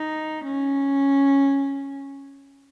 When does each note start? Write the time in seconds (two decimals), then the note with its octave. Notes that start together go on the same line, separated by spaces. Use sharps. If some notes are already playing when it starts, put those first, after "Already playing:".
Already playing: D#4
0.44 C#4